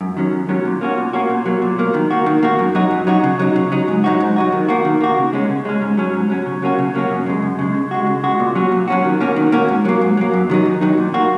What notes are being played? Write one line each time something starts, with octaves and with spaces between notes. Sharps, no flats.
F#2
D#3 F#3 C#4
F#2
D#3 F#3 C#4
A#2
A#3 C#4 F#4
A#2
A#3 C#4 F#4
A#2
F#3 A#3
A#2
F#3 A#3
D#3
A#3 F#4
D#3
A#3 F#4
F#2
F#3 D#4 F#4
F#2
F#3 D#4 F#4
C#3
F#3 D#4
C#3
F#3 D#4
G#2
F#3 D#4 F#4
G#2
F#3 D#4 F#4
D#3
A#3 F#4
D#3
A#3 F#4
C#3
G#3 C#4
C#3
G#3 C#4
G#2
F#3 C#4
G#2
F#3 C#4
C#3
F#3 A#3 C#4 F#4
C#3
F#3 A#3 C#4 F#4
F#2
C#3 G#3
F#2
C#3 G#3
C#3
G#3 F#4
C#3
G#3 F#4
A#2
F#3 C#4 F#4
A#2
F#3 C#4 F#4
D#3
A#3 C#4 F#4
D#3
A#3 C#4 F#4
G#2
F#3 A#3
G#2
F#3 A#3
F#2
D#3 F#3 D#4
F#2
D#3 F#3 D#4
A#2
A#3 F#4